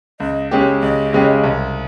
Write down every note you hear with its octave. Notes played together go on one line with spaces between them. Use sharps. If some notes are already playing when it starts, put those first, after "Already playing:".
C#2 D#5
C#3 G#3 C#4 G4
C#2 D#5
C#3 G#3 C#4 G4
C2